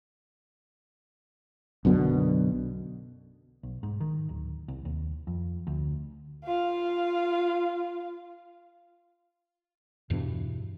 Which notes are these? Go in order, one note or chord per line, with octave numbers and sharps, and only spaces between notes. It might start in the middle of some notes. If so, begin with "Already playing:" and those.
B1 F#2 B2 D3
B1
G#2
D#3
D1
C2
D#2
F2
D2
F4 F5
E2 G2 B2 E3